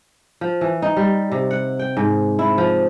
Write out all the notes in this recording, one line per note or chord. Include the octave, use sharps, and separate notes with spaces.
F3
E3
D#4
G3
C3
F#5
G5
G#2
E4
F3